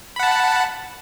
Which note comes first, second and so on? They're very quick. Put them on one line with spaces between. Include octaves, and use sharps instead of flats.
B5 F#5 A5